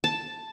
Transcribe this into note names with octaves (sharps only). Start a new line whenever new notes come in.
A5